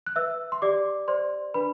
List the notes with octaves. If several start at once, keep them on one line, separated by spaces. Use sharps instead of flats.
F#6
B4 E5 E6
C6
G4 D5 D6
C5 D5 C6
D4 B4 B5